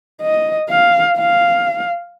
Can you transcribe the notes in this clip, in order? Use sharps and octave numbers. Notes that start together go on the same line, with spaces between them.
D#5
F5
F5